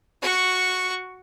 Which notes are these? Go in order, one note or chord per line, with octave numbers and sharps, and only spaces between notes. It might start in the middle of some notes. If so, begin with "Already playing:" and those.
F#4 C#6